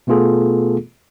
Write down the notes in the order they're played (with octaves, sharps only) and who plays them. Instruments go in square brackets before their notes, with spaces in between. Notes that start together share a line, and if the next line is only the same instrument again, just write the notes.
[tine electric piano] B2 A3 B3 F4 G#4 A4